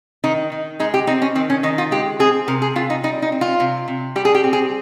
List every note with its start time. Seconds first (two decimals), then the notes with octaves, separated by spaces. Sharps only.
0.24 D#3 D#4
0.52 D#3
0.80 G#3 D#4
0.94 G4
1.07 C4 D#4
1.22 C#4
1.35 D#3 C4
1.50 C#4
1.63 D#3 D#4
1.78 F4
1.91 G#3 G4
2.19 C4 G#4
2.48 C3 A#4
2.62 G#4
2.76 C3 F4
2.90 D#4
3.03 G3 D#4
3.22 D#4
3.32 C4
3.41 F4
3.60 C3
3.88 C3
4.16 G3 G4
4.25 G#4
4.35 G4
4.44 C4
4.53 G#4